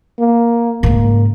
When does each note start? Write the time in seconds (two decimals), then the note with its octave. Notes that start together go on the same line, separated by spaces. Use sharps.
0.19 A#3
0.83 G#2 C#3 A#3